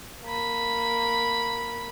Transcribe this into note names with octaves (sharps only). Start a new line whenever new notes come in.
A#3 B5